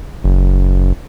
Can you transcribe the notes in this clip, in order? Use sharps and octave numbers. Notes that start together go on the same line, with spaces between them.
F#1